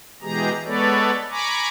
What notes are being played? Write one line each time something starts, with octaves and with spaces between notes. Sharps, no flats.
B2 E3 G#3 G4 G#4 A#5
G#3 B3 A4 B4 C#5 D5
G#5 A#5 B5 C#6 D6